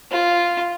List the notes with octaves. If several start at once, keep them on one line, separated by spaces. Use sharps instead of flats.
F4